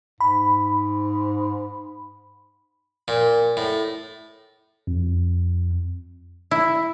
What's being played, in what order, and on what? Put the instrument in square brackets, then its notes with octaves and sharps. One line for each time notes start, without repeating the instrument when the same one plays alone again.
[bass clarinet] G#2 [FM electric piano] B5
[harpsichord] A#2
A2
[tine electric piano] F2
[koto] E4